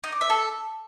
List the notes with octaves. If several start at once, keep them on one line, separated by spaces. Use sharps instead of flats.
D#4
D5
E5
A4